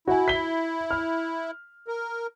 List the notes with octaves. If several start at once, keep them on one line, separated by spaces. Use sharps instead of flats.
E4 F#4 G#5
B6 G7
F6
A#4